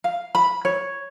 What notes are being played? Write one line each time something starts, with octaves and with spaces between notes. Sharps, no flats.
F5
B5
C#5